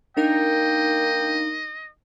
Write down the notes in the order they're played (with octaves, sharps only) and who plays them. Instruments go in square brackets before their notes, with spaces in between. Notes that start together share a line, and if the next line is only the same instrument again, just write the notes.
[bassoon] A#3 [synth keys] D4 D#4 A#4 [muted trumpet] D#5 [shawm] G5